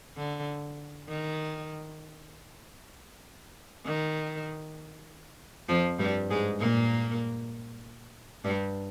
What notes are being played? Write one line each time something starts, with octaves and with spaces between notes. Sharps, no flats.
D3
D#3
D#3
F2 F3
G2 G3
G#2 G#3
A#2 A#3
G2 G3